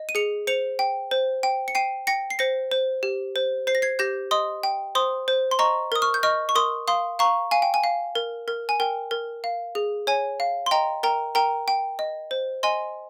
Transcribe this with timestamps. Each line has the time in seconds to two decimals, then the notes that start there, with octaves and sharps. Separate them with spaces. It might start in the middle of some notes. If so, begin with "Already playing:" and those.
Already playing: D#5
0.09 D#7
0.15 G#4 C#7 F7
0.47 C5 C#7 F7
0.79 G5
1.11 C5
1.43 G5
1.68 C#7
1.75 G5 C7 D#7
2.07 G5 A#6 C#7
2.30 C7
2.39 C5 A#6 C#7
2.71 C5
3.03 G4
3.36 C5
3.67 C5 C7
3.75 A#6
3.82 G#6 C7
3.99 G4 G6 A#6
4.31 D#5 C6 D#6
4.63 G5
4.95 C5 C6 D#6
5.28 C5
5.51 C6
5.59 D#5 A#5 C#6
5.92 A#4 D#6
6.02 C#6 F6
6.14 G6
6.23 D#5 C#6 F6
6.49 C#6
6.55 A#4 C6 D#6
6.88 F5 C6 D#6
7.19 F5 A#5 C#6
7.51 F5 G#5
7.62 G5
7.74 G#5
7.84 F5
8.15 A#4
8.48 A#4
8.69 G#5
8.80 A#4 G5
9.11 A#4
9.44 F5
9.75 G#4
10.07 C#5 G#5
10.40 F5
10.66 C6
10.71 D#5 G5 A#5
11.03 A#4 G5 A#5
11.35 A#4 G5 A#5
11.68 G5
11.99 D#5
12.31 C5
12.63 D#5 G#5 C6